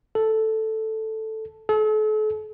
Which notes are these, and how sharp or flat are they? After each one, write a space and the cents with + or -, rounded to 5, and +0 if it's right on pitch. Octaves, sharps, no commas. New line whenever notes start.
A4 +0
A4 -40